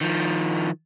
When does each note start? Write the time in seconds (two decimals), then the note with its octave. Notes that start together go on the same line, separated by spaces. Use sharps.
0.01 D#3 F3